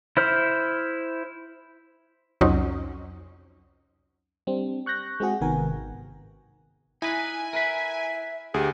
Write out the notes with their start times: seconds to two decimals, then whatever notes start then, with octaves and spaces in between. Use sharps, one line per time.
0.17 E4 C5 F6
2.41 C2 F2 F#3 C4 C#4 D#4
4.47 G3 C4 D4
4.86 C#6 F#6 G6 A#6
5.20 G#3 C4 F#4 G#4 F#5
5.41 G#1 C3 D#3 B3 A#4 G#5
5.71 G#1
7.02 D#4 E4 B4 G#5
7.53 A#4 B4 E5 B5
8.54 D2 G4 G#4